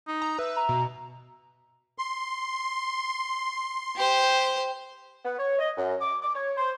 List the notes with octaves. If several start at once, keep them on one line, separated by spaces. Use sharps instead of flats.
D#4
A#5
B4 E5
A#5
B2
C6
G4 C5
B3
C#5
D#5
F#2
D6
D6
C#5
C5